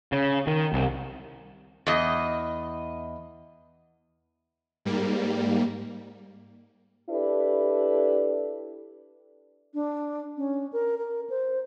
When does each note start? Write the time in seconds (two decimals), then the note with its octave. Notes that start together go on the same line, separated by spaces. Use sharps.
0.12 C#3
0.47 D#3
0.73 C2
1.87 E2 D#5
4.85 G#2 G3 A#3
7.10 D4 E4 G4 A4 B4
9.74 D4
10.37 C#4
10.73 A#4
10.98 A#4
11.30 C5